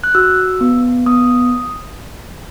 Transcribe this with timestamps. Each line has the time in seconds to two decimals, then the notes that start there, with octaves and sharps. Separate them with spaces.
0.04 F#6
0.15 F#4 E6
0.61 B3
1.06 B3 D#6